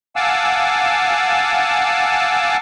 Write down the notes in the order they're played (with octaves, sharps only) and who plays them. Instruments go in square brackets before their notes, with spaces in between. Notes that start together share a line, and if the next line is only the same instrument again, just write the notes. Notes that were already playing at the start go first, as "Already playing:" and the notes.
[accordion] F5 F#5 G#5 A5 D6 E6